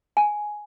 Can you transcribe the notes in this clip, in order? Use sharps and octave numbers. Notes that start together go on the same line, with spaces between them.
G#5